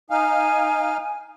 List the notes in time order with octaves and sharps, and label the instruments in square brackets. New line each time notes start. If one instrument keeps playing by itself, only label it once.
[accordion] D#4 F5 [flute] G#5